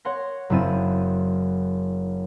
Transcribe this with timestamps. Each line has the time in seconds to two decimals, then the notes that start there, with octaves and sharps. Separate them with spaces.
0.05 C#5 F#5 C6 A#6
0.50 F#1 F#2 C4 E4 A6 D#7